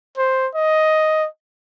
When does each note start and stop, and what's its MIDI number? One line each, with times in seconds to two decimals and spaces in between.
0.17 0.48 72
0.55 1.27 75